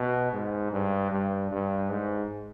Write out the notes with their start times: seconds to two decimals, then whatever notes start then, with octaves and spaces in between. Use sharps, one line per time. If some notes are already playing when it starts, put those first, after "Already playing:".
Already playing: B2
0.33 G#2
0.72 G2
1.11 G2
1.51 G2
1.90 G#2